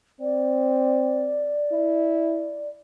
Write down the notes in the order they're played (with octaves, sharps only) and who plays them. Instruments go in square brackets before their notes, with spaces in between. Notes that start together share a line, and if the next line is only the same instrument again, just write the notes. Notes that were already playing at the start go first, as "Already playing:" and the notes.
[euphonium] C4 [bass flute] D5
[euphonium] E4